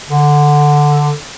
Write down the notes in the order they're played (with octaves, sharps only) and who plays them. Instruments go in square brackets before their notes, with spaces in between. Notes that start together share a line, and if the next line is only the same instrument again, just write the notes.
[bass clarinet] D3